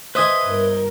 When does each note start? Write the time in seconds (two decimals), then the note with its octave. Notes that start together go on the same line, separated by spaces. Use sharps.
0.15 B4 C5 D#5 E5 G#5 D#6
0.44 G1 A#4